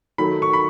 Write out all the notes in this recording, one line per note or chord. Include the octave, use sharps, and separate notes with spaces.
D#3 F#3 A3 B5
C#6
B5